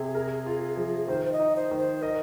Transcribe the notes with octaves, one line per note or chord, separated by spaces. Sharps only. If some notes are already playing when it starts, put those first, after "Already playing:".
Already playing: C3 G#4
A#4
F4
F3
D#3 C5
C5
D#5
D#4
C5
D#3
C5
A#4 D#5